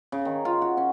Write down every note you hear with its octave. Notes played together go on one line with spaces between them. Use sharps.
C#3
D#3
F4
F#4
C#4